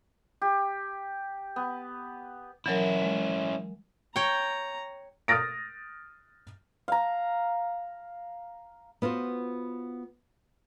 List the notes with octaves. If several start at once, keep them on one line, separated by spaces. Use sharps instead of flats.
G4
B3
E3 F#3 C#4 E4 A#4
G#3
C#5 G5 A#5
D#6 F6 A6 A#6 D7
F5 A#5
B3 F4 F#4 C5